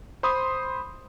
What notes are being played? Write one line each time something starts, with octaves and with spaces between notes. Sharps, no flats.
C5 B5 C6 D#6